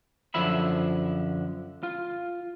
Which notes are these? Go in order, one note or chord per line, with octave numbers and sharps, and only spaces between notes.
F#2 D3 F3 E5 B5
F4